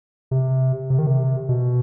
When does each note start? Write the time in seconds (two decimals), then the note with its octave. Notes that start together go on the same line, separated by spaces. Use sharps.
0.31 C3
0.90 C3
0.99 D#3
1.07 C3
1.49 B2